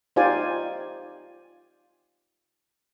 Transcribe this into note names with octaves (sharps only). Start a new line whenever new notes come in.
D#4 F4 G4 C5 D5 G#5